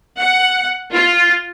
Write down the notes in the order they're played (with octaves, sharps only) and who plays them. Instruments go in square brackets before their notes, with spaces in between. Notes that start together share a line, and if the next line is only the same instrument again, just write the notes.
[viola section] F#5
F4